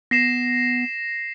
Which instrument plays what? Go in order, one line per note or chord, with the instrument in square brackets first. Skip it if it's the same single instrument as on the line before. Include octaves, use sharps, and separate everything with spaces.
[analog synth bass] B3 [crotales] A#6 C7 E7